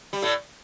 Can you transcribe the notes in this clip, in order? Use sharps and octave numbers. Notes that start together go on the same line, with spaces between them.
G3
A2 A3